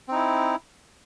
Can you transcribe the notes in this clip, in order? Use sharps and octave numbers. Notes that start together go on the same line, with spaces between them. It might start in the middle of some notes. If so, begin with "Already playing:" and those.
C4 D#4 E4